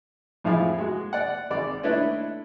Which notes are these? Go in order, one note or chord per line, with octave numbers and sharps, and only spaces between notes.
F2 A2 F3 E4 G#4 F5
G#3 F#4
D5 F#5
G#1 D5 D6
A3 D4 E4 B4 C#5 D#5